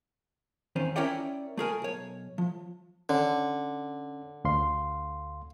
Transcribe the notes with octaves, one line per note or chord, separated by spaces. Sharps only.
E2 D#3 C4 C#4
C#4 E4 A#4 C#5 D5 G5
A3 G#4 A#4 G#5
B1 C#5
F3
D3 C#4
D2 F5 C6